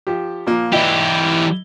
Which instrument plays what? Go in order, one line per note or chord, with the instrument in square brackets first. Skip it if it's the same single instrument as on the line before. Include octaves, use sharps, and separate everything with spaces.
[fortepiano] F3 G4
A#2 F3 A#3
[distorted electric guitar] E3 G4 [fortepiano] D#4 E4 D5